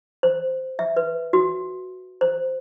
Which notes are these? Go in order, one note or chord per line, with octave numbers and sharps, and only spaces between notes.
C5
E5
B4
F#4
C5